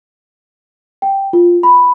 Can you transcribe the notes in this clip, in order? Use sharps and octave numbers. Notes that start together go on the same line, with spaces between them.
G5
F4
B5